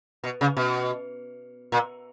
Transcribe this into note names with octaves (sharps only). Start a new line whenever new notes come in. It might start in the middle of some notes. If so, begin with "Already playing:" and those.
B2
C#3
B2
A#2